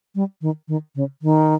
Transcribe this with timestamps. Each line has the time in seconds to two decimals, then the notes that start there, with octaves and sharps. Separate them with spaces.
0.15 G3
0.42 D#3
0.68 D#3
0.95 C#3
1.22 D#3